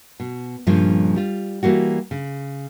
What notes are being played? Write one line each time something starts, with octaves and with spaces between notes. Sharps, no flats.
B2
G2 A#2 C#3 F3 G3
G3 F4
E3 G3 A#3 F#4
C#3